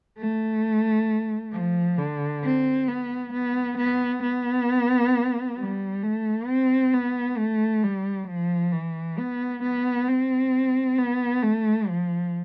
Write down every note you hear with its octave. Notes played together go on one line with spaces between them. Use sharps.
A3
F3
D3
C4
B3
B3
B3
B3
G3
A3
C4
B3
A3
G3
F3
E3
B3
B3
C4
B3
A3
F3